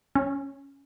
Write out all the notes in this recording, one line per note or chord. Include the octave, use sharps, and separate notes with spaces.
C#4